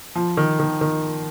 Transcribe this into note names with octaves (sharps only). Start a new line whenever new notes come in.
F3
D#3
D#3
D#3